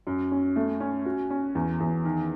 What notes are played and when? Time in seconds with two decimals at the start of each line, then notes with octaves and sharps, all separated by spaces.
0.07 F#2
0.32 C#4
0.56 A3
0.80 C#4
1.06 F#4
1.30 C#4
1.55 E2
1.80 E2
2.05 D#3